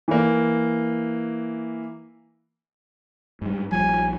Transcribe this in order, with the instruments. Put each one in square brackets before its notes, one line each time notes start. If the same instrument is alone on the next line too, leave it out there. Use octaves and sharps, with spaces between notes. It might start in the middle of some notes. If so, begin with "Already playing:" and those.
[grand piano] E3 A#3
[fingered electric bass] G#2 G3
[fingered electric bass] A#1 F3 G3 [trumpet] G#5